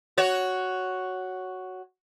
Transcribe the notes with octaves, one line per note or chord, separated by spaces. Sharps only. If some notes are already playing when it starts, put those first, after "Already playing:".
F#4 C#5